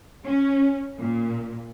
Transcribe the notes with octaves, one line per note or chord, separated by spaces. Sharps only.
C#4
A#2